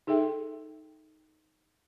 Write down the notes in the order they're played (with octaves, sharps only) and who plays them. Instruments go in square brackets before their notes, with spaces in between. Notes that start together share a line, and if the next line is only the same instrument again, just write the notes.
[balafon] D#4 G#4 A4 E5 G5